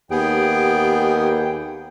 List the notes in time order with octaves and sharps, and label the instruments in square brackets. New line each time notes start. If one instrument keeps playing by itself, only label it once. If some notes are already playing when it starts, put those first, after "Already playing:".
[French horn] D#2 [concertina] B3 G#4 [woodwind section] G4 G5